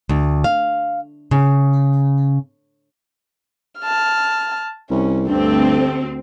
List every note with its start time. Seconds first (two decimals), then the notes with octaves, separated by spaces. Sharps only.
0.09 D2
0.44 F5
1.31 C#3
3.80 A5 F6
4.90 C2 C#4
5.28 D2 G2 C4 G4 A4